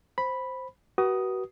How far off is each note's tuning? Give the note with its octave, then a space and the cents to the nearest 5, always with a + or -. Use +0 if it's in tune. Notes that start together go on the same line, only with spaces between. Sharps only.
C5 +0 B5 +0
F#4 +30 B4 -30 D#6 +0